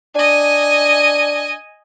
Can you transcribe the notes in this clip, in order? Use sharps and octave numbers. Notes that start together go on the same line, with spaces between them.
D4 D#5 G#5